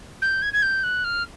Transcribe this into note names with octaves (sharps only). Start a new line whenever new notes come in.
G6
G#6
G#6
G6
F#6
F6